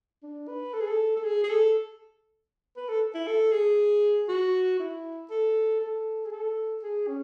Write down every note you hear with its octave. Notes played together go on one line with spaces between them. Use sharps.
D4
B4
A4
G#4
A4
A4
G#4
G#4
A4
B4
A4
E4
A4
G#4
F#4
E4
A4
A4
G#4
A4
G#4
C#4